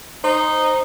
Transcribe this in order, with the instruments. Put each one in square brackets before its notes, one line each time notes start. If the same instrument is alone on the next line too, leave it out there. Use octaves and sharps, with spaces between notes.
[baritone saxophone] D#4 [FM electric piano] C5